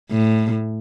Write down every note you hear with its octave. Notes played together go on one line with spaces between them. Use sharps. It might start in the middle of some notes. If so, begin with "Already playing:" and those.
A2